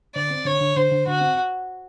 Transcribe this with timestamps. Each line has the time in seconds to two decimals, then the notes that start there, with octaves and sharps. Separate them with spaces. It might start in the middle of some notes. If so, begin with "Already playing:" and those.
0.15 D3 D5
0.31 C4
0.45 D3 C#5
0.61 D3
0.76 D3 C5
0.91 D3
1.07 D3 F#4
1.21 C4